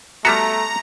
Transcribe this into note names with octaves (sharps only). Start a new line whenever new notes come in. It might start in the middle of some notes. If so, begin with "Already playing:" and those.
G3 A3 B3 F#4 A#5 A#6